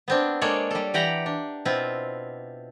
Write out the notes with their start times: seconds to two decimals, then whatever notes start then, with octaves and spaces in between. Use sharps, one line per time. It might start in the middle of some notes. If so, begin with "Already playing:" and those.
0.08 B3 C4 D4
0.41 G#3 A#3 D4 A4 C#5 D5
0.71 G3 A4
0.94 E3 G4 D5 F#5 G5 A#5
1.26 D4
1.65 B2 C4 E4 F4